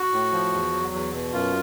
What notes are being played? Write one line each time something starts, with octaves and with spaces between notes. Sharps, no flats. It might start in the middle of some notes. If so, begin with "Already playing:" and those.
Already playing: F#4
A2
F3
E2
F#3
E2
B2
F#2 F4